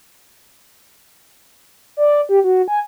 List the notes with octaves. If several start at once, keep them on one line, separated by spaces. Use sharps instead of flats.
D5
G4
F#4
G#5